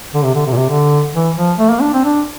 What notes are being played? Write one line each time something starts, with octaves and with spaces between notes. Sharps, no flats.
D3
C3
D3
C3
A#2
C3
D3
E3
F3
A3
A#3
D4
C4
D4